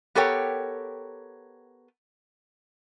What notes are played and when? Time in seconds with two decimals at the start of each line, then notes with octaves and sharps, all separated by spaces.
0.15 B3 G4 A4 A#4 C#5 G5